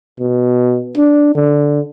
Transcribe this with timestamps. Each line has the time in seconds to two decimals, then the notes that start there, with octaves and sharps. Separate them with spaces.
0.20 B2
0.97 D4
1.35 D3